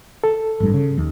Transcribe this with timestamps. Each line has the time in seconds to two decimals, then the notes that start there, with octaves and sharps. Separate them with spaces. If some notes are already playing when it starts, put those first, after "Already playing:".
0.24 A4
0.60 G#1 G2
0.74 C#3
0.98 D#2